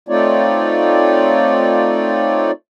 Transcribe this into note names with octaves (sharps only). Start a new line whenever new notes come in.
A3 C4 D#4 F4 C#5 D5